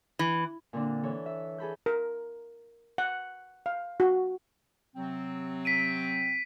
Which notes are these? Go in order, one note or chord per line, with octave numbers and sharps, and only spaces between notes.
E3
A#2 D3 C4 D4
E3 A4 C#5
E5
G#4 A4 B5 G6
A#4
F#5
F5
F#4
C3 F#3 C4
B6 D7 D#7